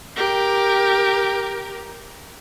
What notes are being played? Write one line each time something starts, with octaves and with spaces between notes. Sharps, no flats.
G4 A#4